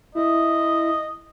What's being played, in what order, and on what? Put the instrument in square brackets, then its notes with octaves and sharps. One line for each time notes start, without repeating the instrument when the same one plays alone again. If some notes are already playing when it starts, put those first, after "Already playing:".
[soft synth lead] E4 [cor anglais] D#5